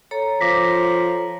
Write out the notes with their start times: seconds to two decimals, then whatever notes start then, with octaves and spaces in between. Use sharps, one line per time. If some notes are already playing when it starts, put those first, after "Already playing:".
0.11 A4 C#5 A#5
0.41 F3 D6 A#6 B6